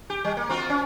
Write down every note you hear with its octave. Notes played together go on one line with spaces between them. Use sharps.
G4
G3
A#3
C4 F4 F#4
C#4